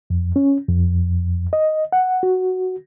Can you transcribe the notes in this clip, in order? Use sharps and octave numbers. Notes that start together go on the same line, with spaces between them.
F2
C#4
F2
D#5
F#5
F#4